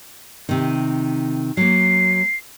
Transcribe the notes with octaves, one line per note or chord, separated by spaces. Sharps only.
C3 D#3
F#3 A#3 C7